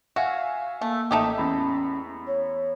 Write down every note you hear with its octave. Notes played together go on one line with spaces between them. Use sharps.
F#4 E5 F5 G#5
A3 A#3
A1 A3 D#4 G4 E5
E2 C#4 B5
C#5